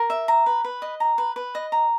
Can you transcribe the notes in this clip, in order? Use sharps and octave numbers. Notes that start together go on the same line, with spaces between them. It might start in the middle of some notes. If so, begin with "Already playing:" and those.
Already playing: A#4
E5
A#5
B4
B4
D#5
A#5
B4
B4
D#5
A#5